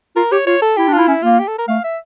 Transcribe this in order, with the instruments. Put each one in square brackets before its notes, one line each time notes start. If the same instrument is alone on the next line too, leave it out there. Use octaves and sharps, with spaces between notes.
[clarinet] F4 [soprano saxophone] A#4
[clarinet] G4 [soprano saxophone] C#5
[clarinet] F4 [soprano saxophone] C#5
[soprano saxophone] A4
[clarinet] E4 [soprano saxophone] G4
[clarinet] D4
[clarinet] E4 [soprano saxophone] F4
[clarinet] C#4 [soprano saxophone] E4
[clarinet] A#3 [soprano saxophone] F4
[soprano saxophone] G4
A4
A#4
[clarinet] A3 [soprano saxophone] F5
[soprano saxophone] E5